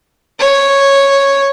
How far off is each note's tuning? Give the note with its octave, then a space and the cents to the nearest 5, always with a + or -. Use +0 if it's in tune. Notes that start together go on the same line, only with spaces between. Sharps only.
C#5 -5